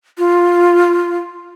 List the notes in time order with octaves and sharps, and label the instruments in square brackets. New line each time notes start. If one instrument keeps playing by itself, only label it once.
[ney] F4